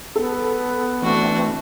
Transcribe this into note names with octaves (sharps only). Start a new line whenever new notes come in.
B3 A4
E3 A3 C4 D4 F#4